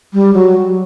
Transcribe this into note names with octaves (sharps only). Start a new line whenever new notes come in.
G3
F#3